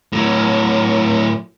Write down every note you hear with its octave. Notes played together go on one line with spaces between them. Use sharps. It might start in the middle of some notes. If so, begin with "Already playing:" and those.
A2 F#3